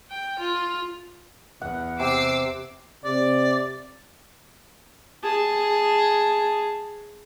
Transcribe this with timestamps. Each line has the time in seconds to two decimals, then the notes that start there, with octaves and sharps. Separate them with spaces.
0.11 G5
0.39 F4
1.62 E2 F#5
2.00 C3 D6 E6 C7
3.04 C3 D5
5.23 G#4 A5